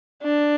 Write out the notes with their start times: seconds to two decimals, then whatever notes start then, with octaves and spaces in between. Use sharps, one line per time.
0.23 D4